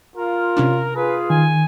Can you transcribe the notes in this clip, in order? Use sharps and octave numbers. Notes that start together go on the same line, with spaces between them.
F4 A#4
C3 C#4 D4
F4 G#4 B4
D#3 G#5